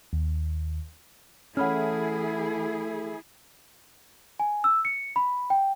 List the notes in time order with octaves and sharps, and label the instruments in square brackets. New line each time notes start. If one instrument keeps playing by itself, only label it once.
[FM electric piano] D#2
[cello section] E3 E4 G#4 [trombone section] A3 [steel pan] C#4 [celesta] F#5 B5 F6
[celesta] G#5
E6
C#7
B5
G5